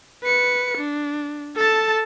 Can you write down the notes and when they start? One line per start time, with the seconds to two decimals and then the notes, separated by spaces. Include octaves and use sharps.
0.23 B4 C#7
0.78 D4
1.56 A4 A5